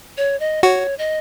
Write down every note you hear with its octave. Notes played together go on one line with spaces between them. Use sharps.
C#5
D#5
F#4 C#5
D#5